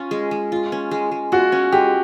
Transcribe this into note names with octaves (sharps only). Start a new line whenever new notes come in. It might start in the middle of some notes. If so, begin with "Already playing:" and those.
Already playing: C#4 F4
G#3
G#3
F4
C#4
G#3
G#3
F4 F#4
C#4
G#3 G4